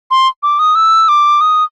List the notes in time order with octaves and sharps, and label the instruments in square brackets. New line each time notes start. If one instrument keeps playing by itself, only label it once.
[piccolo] C6
D6
D#6
E6
D6
D#6